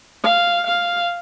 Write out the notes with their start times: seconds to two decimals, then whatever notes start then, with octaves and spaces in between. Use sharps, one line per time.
0.24 F5
0.67 F5